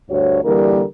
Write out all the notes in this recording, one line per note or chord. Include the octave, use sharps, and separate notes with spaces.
D2 G2 F#4 C#5
D3 E3 G3 A#3 A#4